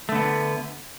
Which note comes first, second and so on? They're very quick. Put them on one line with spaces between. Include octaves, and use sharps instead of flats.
A3 D3 B3